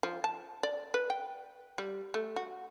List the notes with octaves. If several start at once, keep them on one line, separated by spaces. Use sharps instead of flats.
F3
A5
D5
B4
G5
G3
A3
F#4